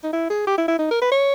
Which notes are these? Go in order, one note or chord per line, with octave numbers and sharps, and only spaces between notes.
D#4
E4
G#4
G4
E4
E4
D#4
A#4
B4
C#5